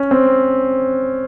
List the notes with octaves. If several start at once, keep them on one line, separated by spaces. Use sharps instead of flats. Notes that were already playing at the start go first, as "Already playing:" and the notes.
Already playing: C#4
C4